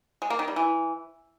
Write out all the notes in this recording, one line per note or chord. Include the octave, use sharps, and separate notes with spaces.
G#3
A#3
D#3
G3
E3